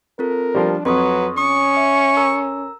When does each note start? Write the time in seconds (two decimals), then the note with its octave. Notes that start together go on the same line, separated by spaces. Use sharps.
0.19 C4 F4 A4 A#4
0.55 F3 G3 D4
0.85 F2 F#3 B4 C6 C#6 D#6
1.38 C#4 C#6 D#6
1.77 E5
2.17 A#4 A#5 E6